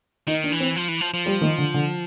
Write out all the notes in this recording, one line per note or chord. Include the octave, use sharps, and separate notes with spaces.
D#3 D#4
D4
E3
C4
F3
E3
F3
F3
G3
D#3
D3
D3